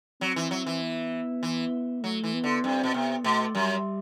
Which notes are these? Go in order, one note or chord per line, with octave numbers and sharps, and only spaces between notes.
F#3 C4
E3
F#3
E3
B3
E3
F#3 A3
E3
B3
D3
G2 C4
B2
C3 B3
B2 A3
F#2 G3